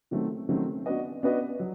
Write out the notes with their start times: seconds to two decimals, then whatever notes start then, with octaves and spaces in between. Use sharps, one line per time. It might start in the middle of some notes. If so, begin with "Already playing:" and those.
0.11 D#3 F#3 A3 C4
0.49 D#3 F#3 A3 C4
0.86 B3 D4 F#4 B4 D#5
1.23 B3 D4 F#4 B4 D#5
1.59 F#3